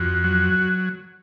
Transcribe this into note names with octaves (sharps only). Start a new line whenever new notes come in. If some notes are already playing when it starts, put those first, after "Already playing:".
Already playing: F2 F#4
F#3